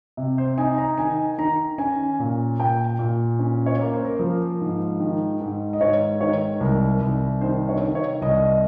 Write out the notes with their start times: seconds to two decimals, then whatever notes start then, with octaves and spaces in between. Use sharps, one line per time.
0.17 C3
0.38 C5
0.58 D#4 G#5
0.78 A#5
0.98 D#3 G#5
1.38 D#3 A#5
1.78 C#4 G#5
2.19 A#2
2.59 A#2 G5
2.99 A#2
3.39 C#4
3.66 C#5
3.80 A#3
3.93 C5
4.05 A#4
4.16 F3 C5
4.61 G#2
5.00 D#3
5.41 G#2
5.73 D#5
5.81 G#2 C#5
6.20 D#3 C#5
6.60 C2 A#4
7.01 C2
7.41 D#3 C5
7.69 C#5
7.82 D#3
7.95 C#5
8.21 C2 D#5